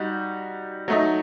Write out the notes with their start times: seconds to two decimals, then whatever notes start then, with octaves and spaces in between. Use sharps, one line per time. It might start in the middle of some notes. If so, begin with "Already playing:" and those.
Already playing: G3 D#4 F#4
0.88 F#3 A3 D#4